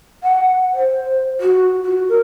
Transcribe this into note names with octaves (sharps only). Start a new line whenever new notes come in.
F#5
C5
F#4
F#4
A#4